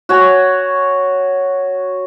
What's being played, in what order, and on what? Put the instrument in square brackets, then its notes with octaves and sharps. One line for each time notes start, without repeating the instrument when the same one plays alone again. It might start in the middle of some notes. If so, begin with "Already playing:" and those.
[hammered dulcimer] F#4 C#5 F#5 G#5